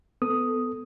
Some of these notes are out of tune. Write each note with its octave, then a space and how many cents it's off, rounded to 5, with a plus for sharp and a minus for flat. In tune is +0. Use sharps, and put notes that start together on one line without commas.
B3 +20 A4 +0 D#6 +0